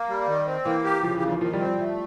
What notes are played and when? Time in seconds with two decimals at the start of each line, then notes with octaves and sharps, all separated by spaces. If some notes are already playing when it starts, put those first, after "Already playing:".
Already playing: A#3
0.09 G3
0.27 D#3
0.47 C4
0.65 E3 A#3
0.84 G4
1.03 C#3 F3
1.15 E3
1.22 D#2
1.28 F3
1.41 D#3 F3
1.53 F3 G3
1.60 C4
1.66 F3 G3
1.79 F3 A3